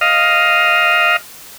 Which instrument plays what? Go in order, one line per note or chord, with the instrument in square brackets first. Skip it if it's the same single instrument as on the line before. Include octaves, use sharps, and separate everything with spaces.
[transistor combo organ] D#5 F5